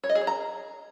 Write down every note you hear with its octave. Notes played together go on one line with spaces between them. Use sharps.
C#5
D#5
G#4
C#5
A#5